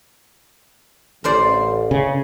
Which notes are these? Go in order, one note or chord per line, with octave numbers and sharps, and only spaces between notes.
A1 A#4 C5 D5
C#3